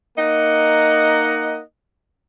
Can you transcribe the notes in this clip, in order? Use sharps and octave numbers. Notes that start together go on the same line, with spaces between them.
A#3 D#4 D#5 F#5